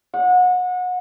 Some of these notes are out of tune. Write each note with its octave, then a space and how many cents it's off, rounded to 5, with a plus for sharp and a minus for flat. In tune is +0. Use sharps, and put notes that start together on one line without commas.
F#5 -30